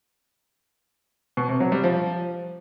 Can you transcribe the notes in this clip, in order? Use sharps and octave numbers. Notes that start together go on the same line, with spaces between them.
B2
C3
F#3
G3
F3